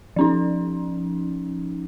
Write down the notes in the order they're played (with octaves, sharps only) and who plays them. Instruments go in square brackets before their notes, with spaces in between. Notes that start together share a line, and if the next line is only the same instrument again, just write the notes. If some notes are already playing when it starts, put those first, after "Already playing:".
[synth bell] F3 C#4 D#4